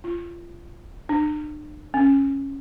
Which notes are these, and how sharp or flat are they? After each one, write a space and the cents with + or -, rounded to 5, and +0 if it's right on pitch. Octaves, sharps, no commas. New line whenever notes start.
F4 -25
D4 +45
C#4 -10